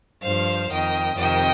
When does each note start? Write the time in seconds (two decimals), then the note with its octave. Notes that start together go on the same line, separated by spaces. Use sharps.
0.22 G2 F3 C5 F5
0.70 F2 D#3 D#5 G5
1.17 F2 C3 D#3 D#5 G5